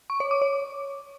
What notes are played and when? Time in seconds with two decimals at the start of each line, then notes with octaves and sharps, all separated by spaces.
0.10 C#6
0.20 C#5
0.31 D6
0.42 C#5